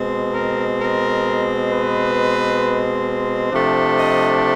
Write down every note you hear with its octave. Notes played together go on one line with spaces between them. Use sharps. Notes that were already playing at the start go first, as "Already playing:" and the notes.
Already playing: B2 G#3 C4
A#4
A#4
B4
C3 F3 A3 D4
D#5